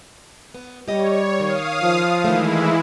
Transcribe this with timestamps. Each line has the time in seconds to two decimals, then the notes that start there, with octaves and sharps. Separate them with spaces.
0.54 B3
0.88 G3 G4 C#5 D#5
1.40 D#3 F5 D#6
1.82 F3
2.24 D#3 E3 G#3 A3 E4